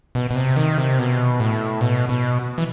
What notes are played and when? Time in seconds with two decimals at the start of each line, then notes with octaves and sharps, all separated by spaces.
0.15 B2
0.31 B2
0.36 C3
0.56 D#3
0.78 C3
0.99 B2
1.40 A2
1.81 B2
2.09 B2
2.58 E3